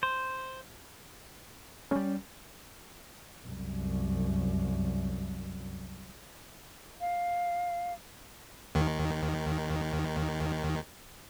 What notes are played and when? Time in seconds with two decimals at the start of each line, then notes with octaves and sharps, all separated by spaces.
0.03 C5
1.91 G3 G#3 C#4
3.45 C2 F#2
7.01 F5
8.75 D#2 D#3